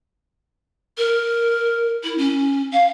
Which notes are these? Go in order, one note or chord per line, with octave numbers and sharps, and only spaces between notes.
A#4
E4
C#4
F5